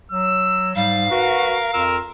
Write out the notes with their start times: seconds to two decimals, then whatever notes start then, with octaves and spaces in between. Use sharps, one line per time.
0.12 F#3 E6
0.76 G#2 G3 F5
1.11 F#4 A#4 B4
1.73 F2 F4 A#4 E6